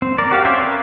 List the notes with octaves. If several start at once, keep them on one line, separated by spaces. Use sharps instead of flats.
C4
A#4 D5
F#4 G4 F5
C#4 C5 D5 E5
A#4 B4 F5